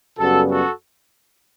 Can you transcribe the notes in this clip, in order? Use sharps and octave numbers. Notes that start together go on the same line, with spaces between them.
F#2 C#3 G3 B3 F#4 A4
F#4 A4